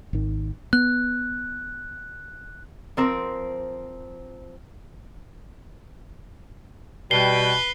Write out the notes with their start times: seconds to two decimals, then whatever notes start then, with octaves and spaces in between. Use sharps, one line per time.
0.13 G#1 D#3
0.73 B3 F#6
2.97 F3 C4 A#4
7.11 B2 G3 B4 G5 C7 G7